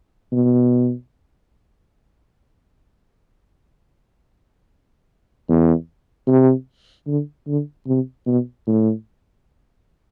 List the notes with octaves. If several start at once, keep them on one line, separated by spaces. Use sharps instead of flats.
B2
E2
C3
D3
D3
C3
B2
A2